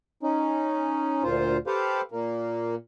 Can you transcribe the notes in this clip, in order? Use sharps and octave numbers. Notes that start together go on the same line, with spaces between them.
C#4 D#4
D2 A#2 F4 C5
G4 A4 B4 C5 F5
A#2 A#3